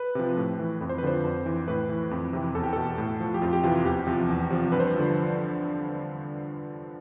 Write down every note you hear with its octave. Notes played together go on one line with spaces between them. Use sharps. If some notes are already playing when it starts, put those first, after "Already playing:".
Already playing: B4
C3 F3
A2
E3
F2
C5
B4
D3 F3 C5
F2
E3
A2 B4
E3
F2
C3 E3
E2 A4
G4
B2 A4
A2
F3
G4
F2 F4
G4
C3 E3 F4
E2 G4
C3 F3
E2
C3 F3
G2 B4
C5
B4
D3 F3